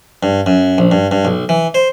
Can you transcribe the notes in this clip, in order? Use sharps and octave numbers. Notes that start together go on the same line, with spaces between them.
G2
F#2
A#1
G2
G2
B1
E3
C5